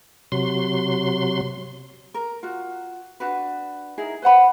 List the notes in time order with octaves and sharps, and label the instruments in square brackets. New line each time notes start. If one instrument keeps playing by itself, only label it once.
[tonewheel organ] C3 F#3 C6
[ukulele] A#4
F4 F#4
D4 F#4 B4
D#4 E4 G#4 A#4
B4 C5 F#5 B5